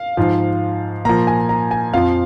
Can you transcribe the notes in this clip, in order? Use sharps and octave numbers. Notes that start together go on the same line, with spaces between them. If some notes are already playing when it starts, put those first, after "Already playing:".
Already playing: F5
G#2 F3
A#2 F3 A#5
G#5
A#5
G#5
F2 F3 F5